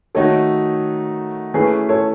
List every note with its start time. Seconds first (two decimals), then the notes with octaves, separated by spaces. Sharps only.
0.15 D#3 A3 D#4 F#4 A4 C#5
1.54 E3 A3 C#4 G#4 B4
1.89 A4 C#5